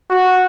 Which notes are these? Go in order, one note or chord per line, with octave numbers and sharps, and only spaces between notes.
F#4